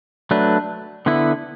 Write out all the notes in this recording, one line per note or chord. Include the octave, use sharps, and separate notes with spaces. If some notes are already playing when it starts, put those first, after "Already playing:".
F#3 A3 D4 B4
D3 B3 E4 B4